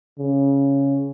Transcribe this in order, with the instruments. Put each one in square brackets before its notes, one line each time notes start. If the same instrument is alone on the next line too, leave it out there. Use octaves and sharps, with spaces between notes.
[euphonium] C#3